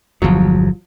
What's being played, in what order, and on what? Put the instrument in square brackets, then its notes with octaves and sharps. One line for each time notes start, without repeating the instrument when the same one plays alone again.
[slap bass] G1 E2 [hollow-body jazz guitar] F3 F#3